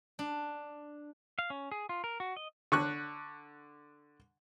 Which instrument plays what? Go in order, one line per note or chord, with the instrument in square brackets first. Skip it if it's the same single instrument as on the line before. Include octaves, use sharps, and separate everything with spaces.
[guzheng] D4
[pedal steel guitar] F5
C#4
G#4
F4
A#4
F#4
D#5
[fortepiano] D3 C#6 F#6